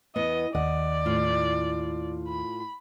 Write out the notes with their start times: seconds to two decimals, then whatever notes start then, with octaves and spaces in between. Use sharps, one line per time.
0.16 E2 B3 D#5
0.55 D#2 D5 D#5 F#5
1.05 A2 F4
2.28 B5